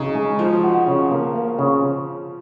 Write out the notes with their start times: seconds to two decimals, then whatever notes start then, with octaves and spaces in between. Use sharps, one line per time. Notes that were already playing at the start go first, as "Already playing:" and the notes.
Already playing: C#3 D#4
0.15 G#3
0.38 F3 D#4
0.63 F#4
0.87 C#3
1.12 A#3
1.36 A#3
1.59 C#3